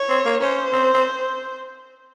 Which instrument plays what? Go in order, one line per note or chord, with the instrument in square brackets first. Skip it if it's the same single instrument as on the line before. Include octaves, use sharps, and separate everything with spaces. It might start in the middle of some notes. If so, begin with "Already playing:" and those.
Already playing: [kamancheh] C#5
[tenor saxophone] C4
A#3
[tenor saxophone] C#4 [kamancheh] C5
[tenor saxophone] C4
C4